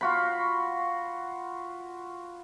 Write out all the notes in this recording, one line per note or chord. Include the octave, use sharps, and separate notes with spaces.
F4 F#4 B5